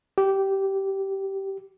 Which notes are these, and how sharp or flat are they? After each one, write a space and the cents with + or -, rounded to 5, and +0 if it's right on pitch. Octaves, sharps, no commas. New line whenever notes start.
G4 -15